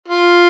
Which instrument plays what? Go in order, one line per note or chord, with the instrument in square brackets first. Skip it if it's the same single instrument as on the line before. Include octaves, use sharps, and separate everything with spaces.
[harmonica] F4